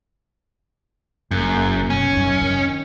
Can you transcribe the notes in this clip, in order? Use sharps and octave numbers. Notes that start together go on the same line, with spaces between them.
F#1 F#2
B2 C#4
F#2 D#3
D#3